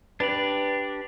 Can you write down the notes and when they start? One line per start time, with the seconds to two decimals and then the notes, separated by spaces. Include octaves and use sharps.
0.20 D4 G4 B4 D5